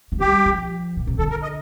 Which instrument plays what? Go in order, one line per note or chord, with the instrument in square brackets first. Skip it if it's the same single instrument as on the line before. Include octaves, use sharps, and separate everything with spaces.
[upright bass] A3
[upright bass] G3 [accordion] G4
[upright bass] F3
A#2
C3
[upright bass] D3 [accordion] A4
[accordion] A#4
D#5